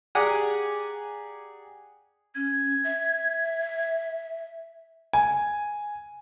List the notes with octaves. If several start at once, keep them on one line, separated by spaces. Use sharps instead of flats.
G4 G#4 D5 F#5 G#5 A#5
C#4 G#6
E5
G#5